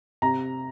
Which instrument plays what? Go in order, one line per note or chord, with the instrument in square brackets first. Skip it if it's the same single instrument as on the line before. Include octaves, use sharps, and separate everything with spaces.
[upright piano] C3 A#5